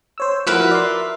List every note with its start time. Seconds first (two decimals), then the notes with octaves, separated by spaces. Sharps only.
0.18 C5 C#5 E6
0.47 F3 E4 F#4 A#4 B4 E5
0.71 D5 C6